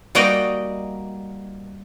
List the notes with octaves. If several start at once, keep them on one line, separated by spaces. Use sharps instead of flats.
G3 A#3 D#4 F#4 D5 D#5